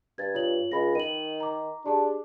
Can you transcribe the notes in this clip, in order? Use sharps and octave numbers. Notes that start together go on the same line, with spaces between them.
G2 G#6 A6
F4 C#5 F#7
C#2 D#5 B5 A#6
D#3 D#7 F#7
A#5 D6
D4 G4 G#4 A5